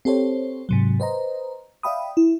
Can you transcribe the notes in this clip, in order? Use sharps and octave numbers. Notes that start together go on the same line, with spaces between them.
C4 G4 A4 C5 C#5
G#2 C3 F#3
B4 C5 D#5 A#5
D5 E5 F5 G5 B5 D#6
E4